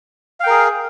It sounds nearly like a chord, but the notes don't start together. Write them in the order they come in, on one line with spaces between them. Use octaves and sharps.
F5 G5 A#4 G#4